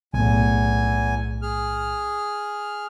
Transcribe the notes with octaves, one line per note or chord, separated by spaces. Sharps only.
B1 E2 A2 G#5
G#4 F6